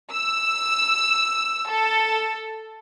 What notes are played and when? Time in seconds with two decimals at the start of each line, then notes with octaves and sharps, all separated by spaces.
0.12 E6
1.70 A4